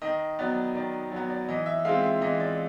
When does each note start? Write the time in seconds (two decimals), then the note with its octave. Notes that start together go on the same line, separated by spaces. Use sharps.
0.02 D#3 D#5
0.39 F#3 B3 D5
0.75 D#3 D5
1.12 F#3 B3
1.30 D5
1.49 E3 D#5
1.66 E5
1.85 G#3 C4 F4 F5
2.03 E5
2.21 E3 D#5
2.40 D5